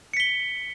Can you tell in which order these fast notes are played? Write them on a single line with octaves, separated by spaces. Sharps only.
C#7 B6 G7